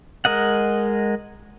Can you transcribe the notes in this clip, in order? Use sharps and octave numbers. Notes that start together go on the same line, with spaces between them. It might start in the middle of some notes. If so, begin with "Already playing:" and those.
G#3 A#4 D#5 F#5